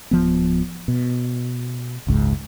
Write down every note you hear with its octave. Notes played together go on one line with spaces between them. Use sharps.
D1 F3 B3
B2
F#1 C#2 G#2